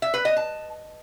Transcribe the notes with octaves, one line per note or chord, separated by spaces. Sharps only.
E5
B4
D#5
A5